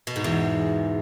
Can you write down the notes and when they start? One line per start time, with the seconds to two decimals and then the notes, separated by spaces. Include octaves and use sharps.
0.07 B2
0.16 G#2
0.24 E2